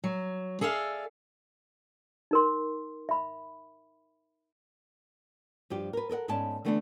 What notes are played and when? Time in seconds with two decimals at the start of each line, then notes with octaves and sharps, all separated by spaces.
0.04 F#3
0.61 G#4 A4 D5 E5 F5
2.31 D#4 A#4 C6
3.09 E5 B5
5.70 G2 F3 G4
5.93 A#4 B4
6.09 A4 A#4 D#5 F#5
6.28 G#2 B3 C#4 D5 A5
6.65 D3 E3 A3 B3 C#4 D4